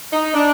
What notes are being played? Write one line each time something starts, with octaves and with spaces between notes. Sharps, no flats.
D#4
D4